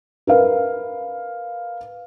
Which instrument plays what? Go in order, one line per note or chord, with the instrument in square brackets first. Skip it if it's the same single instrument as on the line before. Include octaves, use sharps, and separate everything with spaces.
[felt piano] A#4 B4 F5